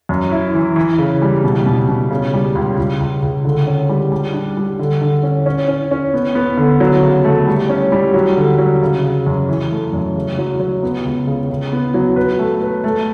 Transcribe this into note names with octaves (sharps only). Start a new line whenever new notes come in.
F#2
E4
E3
E3
C#3
G3
B2
B2
B2
C#3
G3
C#2
C#2
C#2
C#2
D3
C#4
G3
G3
D4
G3
D3
D3
C#4
C#4
C#4
C#4
B3
B3
D3
F#3
C#3
A3
G3
C#4
G3
F#3
D3
F#3
C#3
C#3
F#2
E3
A3
F#2
C#3
F#3
F#3
B3
C#2
C#3
C#3
B3
F#3
B4
A3
B4
A3